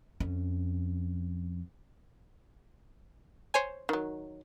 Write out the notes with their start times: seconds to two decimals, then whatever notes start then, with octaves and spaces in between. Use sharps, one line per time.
0.20 F2 C#4
3.54 C5 C#5 G#5
3.89 D#3 F#3